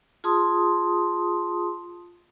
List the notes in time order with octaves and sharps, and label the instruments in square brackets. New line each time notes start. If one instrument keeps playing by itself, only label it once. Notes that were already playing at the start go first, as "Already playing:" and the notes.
[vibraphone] F4 G#4 A5 C6 D#6